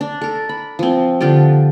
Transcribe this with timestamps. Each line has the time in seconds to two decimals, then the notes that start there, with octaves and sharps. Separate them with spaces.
0.01 D4
0.21 A4 A#4
0.49 B5
0.79 F3 C4
1.21 D3 F3 F4 G4